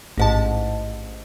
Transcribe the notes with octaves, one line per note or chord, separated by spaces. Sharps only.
A1 G#2 A5